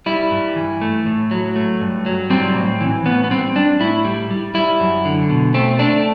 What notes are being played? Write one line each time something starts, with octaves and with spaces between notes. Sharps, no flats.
G3 E4
G2
E3
A3
A2
F#3
A3
G2
F#3
G3 C4
A2
E3
A2 B3
B3
G3 C4
G3 D4
A2 E4
G3
G3
G3 E4
F#2
D3
B2
A3 C4
A3 D4